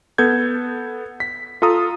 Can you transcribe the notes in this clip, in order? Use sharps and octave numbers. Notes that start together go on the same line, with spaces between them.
B3 A4 G6 G#6
B6
F4 A4 A#5 D#6